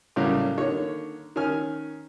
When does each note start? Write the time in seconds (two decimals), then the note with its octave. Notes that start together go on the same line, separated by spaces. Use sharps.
0.16 A2 C#3 F#3 G3 A#3
0.58 D3 D#3 A#3 C#5
1.36 D#3 C#4 G#5 F6